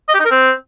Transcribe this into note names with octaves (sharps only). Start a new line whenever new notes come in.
D#5
G4
D#4
A#4
C4